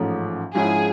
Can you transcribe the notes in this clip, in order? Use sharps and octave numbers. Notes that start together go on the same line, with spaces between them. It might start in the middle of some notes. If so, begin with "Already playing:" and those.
Already playing: A1 G#2 F3 A3 C#4
G#2 F3 G#3 C#4 E4 G#4